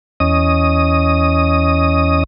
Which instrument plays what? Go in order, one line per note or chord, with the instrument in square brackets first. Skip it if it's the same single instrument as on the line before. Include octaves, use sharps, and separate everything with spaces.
[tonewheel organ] E2 C#4 D#5 D#6